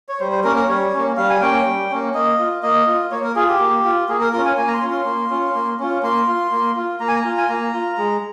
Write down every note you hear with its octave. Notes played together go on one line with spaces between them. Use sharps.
C#5
G3 C5
C5
A#3 C#4 A#4
A#4
G3 C#5
A#3 C#4
G3 F5
G#5
A#3 C#4 G5
G3
A#3 C#4
A#3 D#5
F4
A#3 D#5
F4
A#3 C#5
A#4
F4 G#4
G4
A#3
F4
A#3 G#4
A#4
C#4 F4 A#4
G#5
A#3 G#5
A#5
C6
C#4 F4
C6
A#3
C#4 F4
A#3
C#4 F4
A#3 C6
F4
A#3
F4
A#3 A#5
G#5
A#5
F4
G#5
A#3 A#5
F4
G#3